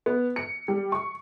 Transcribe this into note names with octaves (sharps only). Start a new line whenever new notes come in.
B3
C#7
G3
C#6